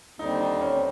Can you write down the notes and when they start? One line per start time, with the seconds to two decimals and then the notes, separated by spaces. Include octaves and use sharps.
0.19 D#2 D3 G3 C4 D#4
0.40 D#4
0.61 C#4